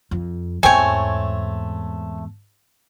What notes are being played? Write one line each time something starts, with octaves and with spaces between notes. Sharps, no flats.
F2
E2 G#2 A3 C4 C#5 G5 G#5